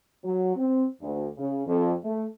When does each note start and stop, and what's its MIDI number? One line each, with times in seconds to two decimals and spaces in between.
0.24 0.54 54
0.56 0.85 60
1.01 1.27 38
1.38 1.62 49
1.67 1.93 41
2.04 2.25 57